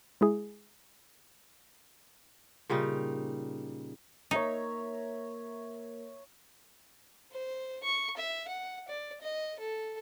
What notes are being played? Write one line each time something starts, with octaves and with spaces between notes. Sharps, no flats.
G#3 E4 G#4
A#2 C#3 G3 D#4
A#3 D#4 A#4 C#5 E5 A#5
C5
C#6
E5
F#5
D5
D#5
A4